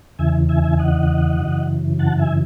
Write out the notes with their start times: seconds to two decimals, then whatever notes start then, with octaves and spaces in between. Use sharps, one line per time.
0.19 E2 C#3 E3 E5 G#5
0.49 E5 G#5
0.64 E5 G#5
0.79 D#5 F#5
1.39 F#2 C#3 E3
1.99 F#5 A5
2.19 E5 G#5